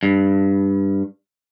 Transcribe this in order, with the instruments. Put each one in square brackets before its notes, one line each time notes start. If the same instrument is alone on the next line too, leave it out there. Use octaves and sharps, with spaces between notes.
[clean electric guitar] G2